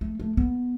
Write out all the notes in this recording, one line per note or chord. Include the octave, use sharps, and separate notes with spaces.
A3
A3
B3